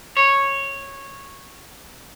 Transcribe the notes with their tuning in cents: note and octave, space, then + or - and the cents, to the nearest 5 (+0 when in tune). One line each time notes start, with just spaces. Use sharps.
C#5 -10